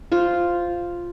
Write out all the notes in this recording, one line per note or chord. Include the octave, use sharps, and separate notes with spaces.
F4 C5